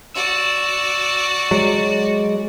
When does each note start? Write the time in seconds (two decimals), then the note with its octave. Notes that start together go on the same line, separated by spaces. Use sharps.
0.15 F#4 D5 E6
1.51 F#3 G#3